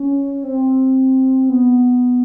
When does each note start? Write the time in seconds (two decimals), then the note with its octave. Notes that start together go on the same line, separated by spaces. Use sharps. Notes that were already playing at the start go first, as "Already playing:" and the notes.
Already playing: C#4
0.44 C4
1.49 B3